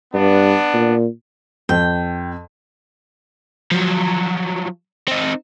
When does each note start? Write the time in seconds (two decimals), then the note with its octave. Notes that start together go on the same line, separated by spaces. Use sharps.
0.14 G2 B3 D4
0.74 A#2
1.69 F2 G5
3.71 F3 F#3
5.08 C4 D#4